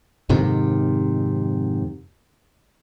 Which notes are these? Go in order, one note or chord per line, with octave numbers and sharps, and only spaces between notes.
F2 G#2 C3 D#3